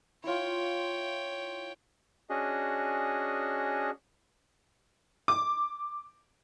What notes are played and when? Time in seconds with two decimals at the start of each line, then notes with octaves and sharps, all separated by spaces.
0.24 E4 F4 C#5 G5
2.30 C#4 D4 F#4 G#4 D#5
5.28 D6